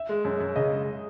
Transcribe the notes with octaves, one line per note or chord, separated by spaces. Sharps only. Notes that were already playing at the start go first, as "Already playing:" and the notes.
Already playing: E5
G#3
F#2
F#2
C#3 D#5
G#3